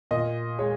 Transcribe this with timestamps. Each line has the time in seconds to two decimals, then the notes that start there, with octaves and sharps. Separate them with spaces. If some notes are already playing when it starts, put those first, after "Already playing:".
0.11 A#2 D#5
0.59 G#3 C#5